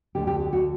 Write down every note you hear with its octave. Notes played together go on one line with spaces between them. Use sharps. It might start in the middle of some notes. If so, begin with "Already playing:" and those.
D2 D3 G4
G4
G4
F#4